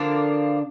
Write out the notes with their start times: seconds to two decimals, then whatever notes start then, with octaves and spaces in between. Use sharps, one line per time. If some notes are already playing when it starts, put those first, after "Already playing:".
Already playing: D3 F3 A#3 D4